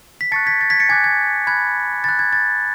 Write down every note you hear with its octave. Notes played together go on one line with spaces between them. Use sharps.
B6
A5 C#6 F#6 A6 C#7
G#6 B6
A6
G#6 B6
A6 C#7
G#5 D6 F#6 G#6
G#6
B5 F#6 G#6
B5 F#6 A6
G#6
A6